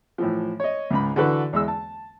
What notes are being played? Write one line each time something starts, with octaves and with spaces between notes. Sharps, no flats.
A2 E3 F3
C#5 D#5
C#2 G#2 B5
D3 E3 F#4 A4 B4
E2 G#3 E6
A5